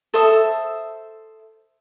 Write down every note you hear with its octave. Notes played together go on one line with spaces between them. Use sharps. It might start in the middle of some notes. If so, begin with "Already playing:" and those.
A4 C5 E5 D#6